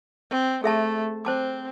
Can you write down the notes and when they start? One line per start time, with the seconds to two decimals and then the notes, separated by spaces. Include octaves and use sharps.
0.30 C4
0.64 A3 G#4 E5 A5
1.25 C4 C5 A5 D6